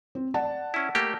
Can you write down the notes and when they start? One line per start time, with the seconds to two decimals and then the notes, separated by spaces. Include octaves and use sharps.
0.15 C4
0.34 D5 F#5 A5
0.74 C#4 E4
0.95 A3 A#3 G4